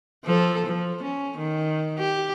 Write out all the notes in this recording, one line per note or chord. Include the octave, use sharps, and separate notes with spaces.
F3 A4
F3
C#4
D#3
G4